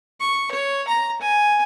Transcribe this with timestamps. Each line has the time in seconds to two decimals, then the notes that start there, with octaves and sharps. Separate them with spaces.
0.20 C#6
0.52 C#5
0.88 A#5
1.21 G#5